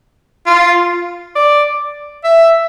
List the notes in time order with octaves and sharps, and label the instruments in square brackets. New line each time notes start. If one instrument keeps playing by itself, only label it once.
[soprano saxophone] F4
D5
E5